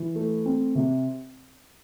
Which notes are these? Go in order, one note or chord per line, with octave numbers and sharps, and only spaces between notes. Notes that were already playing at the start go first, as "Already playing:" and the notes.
Already playing: E3
A3
C4
C3